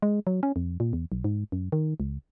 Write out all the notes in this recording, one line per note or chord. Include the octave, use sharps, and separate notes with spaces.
G#3
F#3
C#4
F2
A#2
E2
B1
G#2
F#2
D#3
C#2